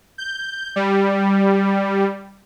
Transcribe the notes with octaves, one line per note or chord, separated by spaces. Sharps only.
G6
G3